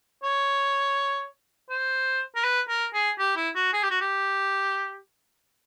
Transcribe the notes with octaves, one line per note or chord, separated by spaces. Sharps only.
C#5
C5
A#4
B4
A#4
G#4
G4
E4
F#4
G#4
G4
F#4
G4